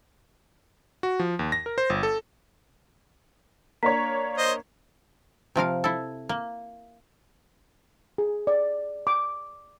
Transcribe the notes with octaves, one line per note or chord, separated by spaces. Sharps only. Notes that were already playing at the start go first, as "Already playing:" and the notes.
F#4
F3
D#2
A#6
A#4
C5
G1
A4
A#3 D4 C#5 A#5 B6
C5 D#5
C3 F3 A#4 F5
E4 A4
A#3
G#4
D5
D6